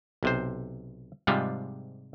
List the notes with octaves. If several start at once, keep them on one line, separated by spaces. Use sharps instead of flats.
B1 C3 C5
G#2 C3 F3 G3 G#3 F4